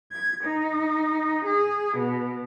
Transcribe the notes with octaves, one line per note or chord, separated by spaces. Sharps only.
G#6
D#4
G#4
B2